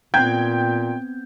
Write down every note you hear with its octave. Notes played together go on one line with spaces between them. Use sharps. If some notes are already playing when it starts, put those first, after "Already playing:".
A#2 B3 C4 G5 G6 G#6